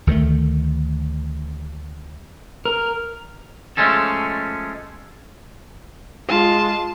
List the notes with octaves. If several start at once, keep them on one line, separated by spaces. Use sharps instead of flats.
D2 D#3 E3 A3
A#4
F3 G#3 A3 C#4 A4
G#3 F4 A5